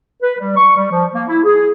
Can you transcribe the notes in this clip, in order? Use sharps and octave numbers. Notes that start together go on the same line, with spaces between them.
B4
G3
C#6
G3
F3
A#3
E4
G#4